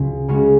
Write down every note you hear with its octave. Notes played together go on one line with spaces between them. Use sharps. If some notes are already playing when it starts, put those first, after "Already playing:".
Already playing: C#2 C#3 F#3
C#3 G#3 C#4 F#4